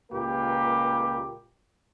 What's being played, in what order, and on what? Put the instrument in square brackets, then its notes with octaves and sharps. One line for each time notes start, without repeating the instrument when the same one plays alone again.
[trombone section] C#2 A#2 A#3 G4 A#4 B4